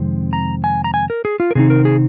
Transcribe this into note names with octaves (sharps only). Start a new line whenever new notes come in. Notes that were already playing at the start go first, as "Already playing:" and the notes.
Already playing: F2 C3 D#3 G#3 C4
A#5
G#5
A#5
G#5
A#4
G#4
F4
A#4
C3 D#3 C4 D#4 G#4
A#4
G#4